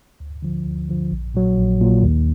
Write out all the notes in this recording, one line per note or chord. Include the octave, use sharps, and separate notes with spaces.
D2
D3 F3
D2
D3 F3
A#1
A#2 F#3
A#1
A#2 F#3
D#2